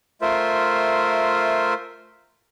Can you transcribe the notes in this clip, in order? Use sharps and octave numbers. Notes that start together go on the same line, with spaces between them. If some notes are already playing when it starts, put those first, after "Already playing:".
A3 F4 A#4 C5 E5